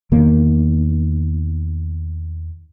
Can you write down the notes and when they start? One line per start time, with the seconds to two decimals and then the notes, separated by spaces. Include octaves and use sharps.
0.12 E2 D#3 A#3